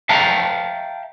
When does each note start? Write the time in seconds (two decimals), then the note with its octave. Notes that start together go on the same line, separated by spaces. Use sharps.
0.09 E5 F5 G5 A5 A#5